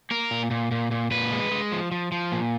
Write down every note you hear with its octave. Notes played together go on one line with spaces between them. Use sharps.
A#3 A#4
A#2
A#2
A#2
A#2
A#2 B4
G#3
G#3
F3
F3
F3
A#2